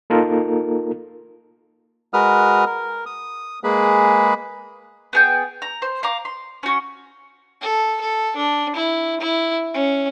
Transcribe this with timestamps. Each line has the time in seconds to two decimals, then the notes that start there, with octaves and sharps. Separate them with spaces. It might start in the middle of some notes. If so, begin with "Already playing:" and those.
0.10 A#3 D#4 F4 A4 A#4
2.14 G#3 F#4 A#4 B4 D#6 F6
2.66 A#4
3.06 D#6
3.64 G#3 A#3 G#4 B4 B5
5.13 B3 G#4 G5
5.62 A#5
5.82 C5
6.03 F5 A#5 D6
6.25 C6
6.63 C#4 F#4
7.61 A4
8.01 A4
8.36 D4
8.75 E4
9.21 E4
9.74 C#4